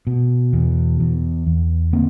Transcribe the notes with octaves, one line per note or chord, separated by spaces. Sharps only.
B2
E2
E2
E2
D3 A#3 C4